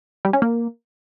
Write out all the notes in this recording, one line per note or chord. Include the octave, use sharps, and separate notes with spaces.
G3
C#4
A#3